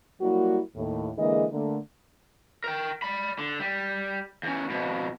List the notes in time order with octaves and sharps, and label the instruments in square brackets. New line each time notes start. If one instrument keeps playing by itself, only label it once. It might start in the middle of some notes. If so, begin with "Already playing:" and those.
[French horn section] F#3 G3 A#3 E4 F#4
D#2 A2
D3 E3 G#3 A#3 G#4 D#5
D3 A3 A#3
[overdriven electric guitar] A#4 G5
D5 B5
D3
G3
E2 C#4
F2 B2